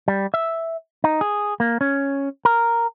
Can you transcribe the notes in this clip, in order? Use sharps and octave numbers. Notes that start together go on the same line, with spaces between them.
G3
E5
D#4
G#4
A#3
C#4
A#4